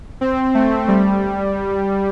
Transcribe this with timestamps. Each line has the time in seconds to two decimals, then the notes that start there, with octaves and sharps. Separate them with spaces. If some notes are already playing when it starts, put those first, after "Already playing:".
0.21 C4
0.55 A3
0.88 G3